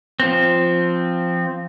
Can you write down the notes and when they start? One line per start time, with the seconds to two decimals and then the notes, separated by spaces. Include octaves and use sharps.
0.20 F3 C4